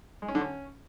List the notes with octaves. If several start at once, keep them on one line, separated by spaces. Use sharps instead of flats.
G#3
C#4
D3
C#4